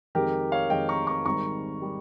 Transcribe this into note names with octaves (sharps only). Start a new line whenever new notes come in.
F2 D#3 G#3 G4 A#4
C#5 F5
F2 D#3 G#3 D#5 G5
A#5 C#6
A#5 C#6
G#1 G#2 G3 A#5 C#6
G3